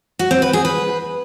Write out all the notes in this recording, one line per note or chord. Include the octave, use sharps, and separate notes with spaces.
F#4
C4
B4
G#4
B4